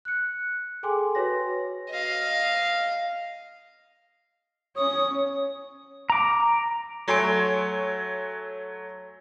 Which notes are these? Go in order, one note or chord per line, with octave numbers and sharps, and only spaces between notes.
F#6 C#7
G#4 A4 G5 G#5 C6 D6
F#4 B4 C#5 A#6
D#5 F5
C#4 C#5 D#6
A#5 D6
F#3 A3 C#5 G#5 C6 D7